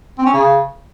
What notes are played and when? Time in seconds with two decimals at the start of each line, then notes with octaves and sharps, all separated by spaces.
0.18 C4
0.26 C#4
0.33 C#3